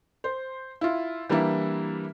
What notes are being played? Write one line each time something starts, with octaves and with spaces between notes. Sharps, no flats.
C5
E4 F4
E3 G3 A#3 D4 E4